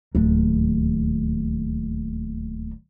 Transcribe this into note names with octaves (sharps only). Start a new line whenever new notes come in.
D1 D#2